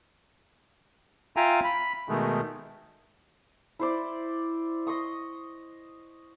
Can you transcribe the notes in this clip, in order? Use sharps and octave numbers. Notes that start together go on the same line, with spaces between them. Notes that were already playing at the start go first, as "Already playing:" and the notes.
F4 E5 F5 G5 G#5 A#5
B5
B2 D#3 G#3 A3
E4 C5 D5
D#5 C6 C#6 D#6